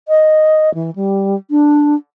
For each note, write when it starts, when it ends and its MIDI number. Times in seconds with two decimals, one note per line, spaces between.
0.08 0.72 75
0.74 0.90 52
0.95 1.35 55
1.50 1.95 62